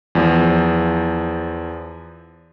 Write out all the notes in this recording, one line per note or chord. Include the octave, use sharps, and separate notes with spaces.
E2 F3